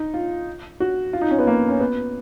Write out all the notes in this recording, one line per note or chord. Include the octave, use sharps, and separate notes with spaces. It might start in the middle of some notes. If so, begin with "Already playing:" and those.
Already playing: D#4
F4
F#4
F4
D#4
C#4
B3
A#3
C#4
B3